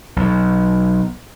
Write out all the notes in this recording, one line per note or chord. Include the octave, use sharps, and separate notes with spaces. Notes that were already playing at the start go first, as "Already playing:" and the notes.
B1